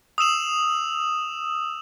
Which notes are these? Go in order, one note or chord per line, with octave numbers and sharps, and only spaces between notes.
D#6 E6 E7 F#7